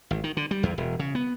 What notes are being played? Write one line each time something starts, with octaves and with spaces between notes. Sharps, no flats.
G#1
D#3
D3
G3
E2
E1
C#3
B3